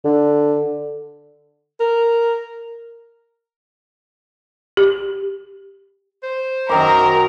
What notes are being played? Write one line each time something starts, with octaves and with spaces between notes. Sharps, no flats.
D3
A#4
G4
C5
F#2 D#3 A#4 A#5 D6